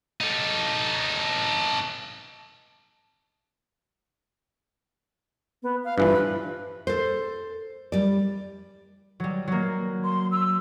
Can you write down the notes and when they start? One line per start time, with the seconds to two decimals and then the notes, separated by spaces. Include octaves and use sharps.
0.21 D#4 A4
5.63 B3
5.84 F5
5.98 G2 E3 F3 B4
6.87 A4 C5
7.92 G3 D5
9.20 F#3 G3
9.48 F#3 A#3
10.04 C6
10.31 E6